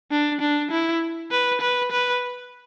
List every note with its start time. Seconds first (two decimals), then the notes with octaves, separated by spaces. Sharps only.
0.11 D4
0.41 D4
0.71 E4
1.31 B4
1.61 B4
1.92 B4